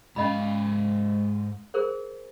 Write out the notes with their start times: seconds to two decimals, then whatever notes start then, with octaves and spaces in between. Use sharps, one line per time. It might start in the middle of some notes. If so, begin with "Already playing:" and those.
0.16 G#2 C#4 D#5 F5 B5
1.74 G#4 A#4 C5